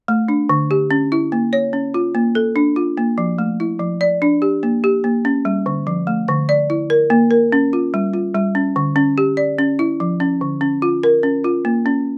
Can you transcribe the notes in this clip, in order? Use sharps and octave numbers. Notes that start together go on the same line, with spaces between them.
A3
D4
D3
G4
C#4
E4
A#3
C#5
C#4
F4
A#3
A4
D4
F4
A#3
F3
A3
E4
F3
D5
D4
G4
A#3
G4
A#3
C#4
G3
D3
F3
A3
D3
D5
E4
A#4
A#3
A#4
C#4
F4
G3
F4
G3
C#4
D3
C#4
G4
D5
C#4
E4
F3
C#4
D3
C#4
F4
A#4
C#4
F4
A#3
C#4